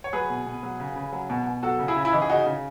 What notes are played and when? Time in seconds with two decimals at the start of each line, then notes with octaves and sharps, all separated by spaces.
0.04 C#5
0.13 F#3 G#4 B4
0.30 B2
0.46 B2
0.63 F#3
0.80 C#3
0.96 C#3
1.13 F#3
1.30 B2
1.47 B2
1.63 F#3 F#4 A4
1.79 C#3
1.88 E4 G#4
1.96 C#3
2.05 E4
2.13 E3 D#4
2.22 G#4
2.29 C#3 D#4 F#4
2.46 C#3